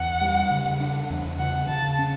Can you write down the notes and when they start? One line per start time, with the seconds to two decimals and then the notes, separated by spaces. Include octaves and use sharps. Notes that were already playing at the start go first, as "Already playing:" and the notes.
Already playing: E2 F#5
0.21 G3
0.51 C#3
0.80 D4
1.10 E2
1.39 C#3 F#5
1.69 C#3 A5
1.99 C#4